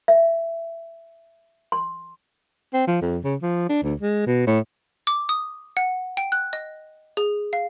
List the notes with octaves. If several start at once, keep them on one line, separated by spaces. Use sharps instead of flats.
E5
C6
C4
F3
F2
C#3
F3
D4
D2
G#3
B2
A2
D6
D#6
F#5
G5
F#6
D#5
G#4
F5